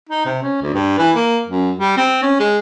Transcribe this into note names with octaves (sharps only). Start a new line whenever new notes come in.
D#4
C3
C#4
D2
G2
E3
A#3
F#2
G3
C4
C#4
G#3